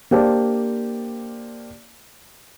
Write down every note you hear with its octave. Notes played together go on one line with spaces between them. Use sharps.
A#3 D4 G4 C5 D5 A5